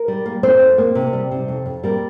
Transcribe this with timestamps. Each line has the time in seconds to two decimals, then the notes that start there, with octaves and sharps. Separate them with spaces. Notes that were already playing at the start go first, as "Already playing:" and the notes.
Already playing: A#4
0.08 G3
0.26 A#3
0.43 F2 C4 C5
0.60 F2
0.78 A#3
0.95 C3
1.13 G3
1.31 C3
1.48 F2
1.66 F2
1.84 G3 A#3 A#4